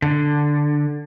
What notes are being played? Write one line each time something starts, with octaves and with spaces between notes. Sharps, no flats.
D3